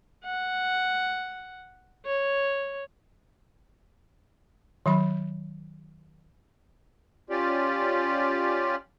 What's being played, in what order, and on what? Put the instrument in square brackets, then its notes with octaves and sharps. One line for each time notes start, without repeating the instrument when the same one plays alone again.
[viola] F#5
C#5
[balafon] D#3 F#3 B5
[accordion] C#4 F4 G4 D5